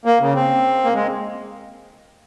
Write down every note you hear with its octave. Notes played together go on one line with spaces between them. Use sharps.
A#3
C#3
C4
A#3
G#3